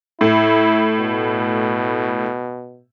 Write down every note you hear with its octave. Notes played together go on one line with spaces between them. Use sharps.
A2 E4
B2